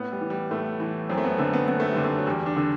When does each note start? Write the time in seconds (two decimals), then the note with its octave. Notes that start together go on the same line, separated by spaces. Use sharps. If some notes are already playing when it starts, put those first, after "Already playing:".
Already playing: A2 B3
0.12 G3
0.21 E3
0.30 G3
0.51 A2 A3
0.80 E3
1.09 F#2 C4
1.18 A3
1.24 B3
1.38 D3 A3
1.53 B3
1.68 F#2 B3
1.80 A3
1.92 G3
1.97 D3
2.04 A3
2.18 F#3
2.26 E2 G3
2.46 D4
2.56 D3